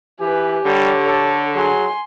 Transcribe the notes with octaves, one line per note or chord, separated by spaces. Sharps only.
E3 G4 B4 G#5
D3 G3 C#5
A4
F#3 G#4 G#5 C6